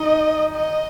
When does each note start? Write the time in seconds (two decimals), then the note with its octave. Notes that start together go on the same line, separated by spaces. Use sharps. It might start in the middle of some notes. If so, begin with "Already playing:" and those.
Already playing: D#4 D#5
0.54 D#5